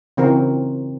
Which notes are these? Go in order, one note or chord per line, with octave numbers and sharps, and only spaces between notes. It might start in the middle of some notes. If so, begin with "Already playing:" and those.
C#3 E3 C4 D#4 F#4 A#4